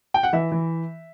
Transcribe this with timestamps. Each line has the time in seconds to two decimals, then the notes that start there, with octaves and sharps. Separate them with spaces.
0.14 G5
0.23 F#5
0.33 E3 E5
0.52 E3